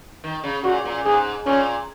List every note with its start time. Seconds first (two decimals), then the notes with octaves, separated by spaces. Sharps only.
0.24 D#3
0.44 C#3
0.64 A#2 F#4
0.85 A#2
1.05 G#2 G#4
1.46 A#2 C#4